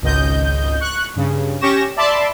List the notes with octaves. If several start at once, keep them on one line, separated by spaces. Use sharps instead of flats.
G#1 C#2 D#5 G6
C#6 F#6
G2 C#3
C#4 G4 C#6 A#6 E7
D5 E5 A5 B5 C6 D6